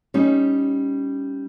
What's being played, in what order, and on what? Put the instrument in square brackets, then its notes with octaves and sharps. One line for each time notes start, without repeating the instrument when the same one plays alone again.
[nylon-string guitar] G3 C#4 D#4